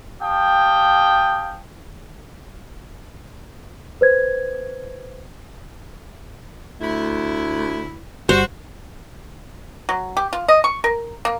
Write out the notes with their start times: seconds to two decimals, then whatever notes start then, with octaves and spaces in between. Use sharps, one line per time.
0.21 G4 F5 G5 A5 D#6
4.01 B4 C5 G#6
6.81 D2 E4
8.29 G1 G3 F#4 C5
9.89 F#3
10.17 G4
10.33 F4
10.48 D#5
10.64 C#6
10.84 A#4
11.25 A#3